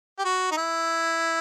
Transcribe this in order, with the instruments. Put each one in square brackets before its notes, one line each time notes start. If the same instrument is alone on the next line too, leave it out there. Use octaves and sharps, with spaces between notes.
[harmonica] G4
F#4
D#4
E4